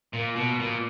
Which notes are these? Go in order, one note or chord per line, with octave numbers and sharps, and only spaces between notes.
A#2
B2
A#2